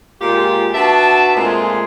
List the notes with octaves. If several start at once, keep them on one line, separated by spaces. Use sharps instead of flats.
A#2 G#3 F4 G4
D4 F#4 B4 E5 A5
A#2 G#3 A3 C4 F4 G#4